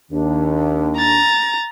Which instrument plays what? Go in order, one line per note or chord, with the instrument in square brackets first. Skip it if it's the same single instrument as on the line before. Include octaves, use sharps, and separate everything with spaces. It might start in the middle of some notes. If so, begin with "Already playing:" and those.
[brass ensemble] D#2 [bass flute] D4
[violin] A#5 [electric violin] A6